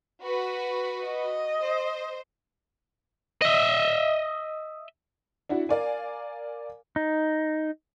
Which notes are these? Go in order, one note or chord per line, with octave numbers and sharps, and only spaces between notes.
F#4 B4
D#5
C5
D#5 E5
D4 E4 F#4
A#4 D5 F5 G#5
D#4